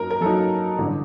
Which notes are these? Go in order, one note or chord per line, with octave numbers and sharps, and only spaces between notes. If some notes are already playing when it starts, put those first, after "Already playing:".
Already playing: F#2 F#3 A#3 D#4 A#4
A#4
F#2 F#3 A#3 D#4 A4
A1 G2 D3